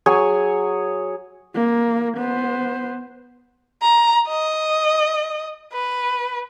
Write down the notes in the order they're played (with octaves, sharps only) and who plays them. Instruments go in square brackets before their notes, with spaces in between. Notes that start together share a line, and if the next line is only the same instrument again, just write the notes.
[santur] F#3 G#4 C#5 G#5
[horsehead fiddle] A#3
B3 C5
[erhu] A#5
D#5
B4